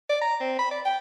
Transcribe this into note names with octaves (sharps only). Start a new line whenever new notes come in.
D5
A#5
C4
B5
D5
G5